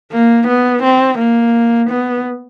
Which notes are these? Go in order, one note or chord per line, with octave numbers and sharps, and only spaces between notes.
A#3
B3
C4
A#3
B3